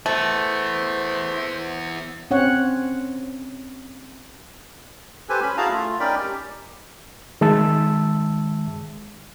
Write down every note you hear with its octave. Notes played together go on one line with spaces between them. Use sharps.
E3 A3 B3 C5
C4 C#4 C#5 F#5
G4 A4 B4 C5 G#5
C#4 B5
E4 F#4 G#4 F5 A5 A#5
A3 F4
C#4 D#4 A#4 D5 G5 B5
G4
D#3 G#3 E5 A5 E6